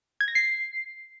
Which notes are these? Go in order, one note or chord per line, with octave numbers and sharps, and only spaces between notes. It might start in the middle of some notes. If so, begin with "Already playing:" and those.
G#6
A#6
C7